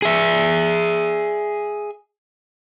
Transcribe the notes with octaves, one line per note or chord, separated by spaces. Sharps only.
G#4 E5